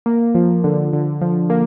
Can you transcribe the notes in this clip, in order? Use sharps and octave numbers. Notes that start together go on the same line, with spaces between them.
A#3
F3
D3
D3
F3
A#3